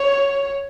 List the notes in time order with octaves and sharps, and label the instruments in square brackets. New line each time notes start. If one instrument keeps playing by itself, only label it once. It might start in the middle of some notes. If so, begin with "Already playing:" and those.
Already playing: [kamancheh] C#5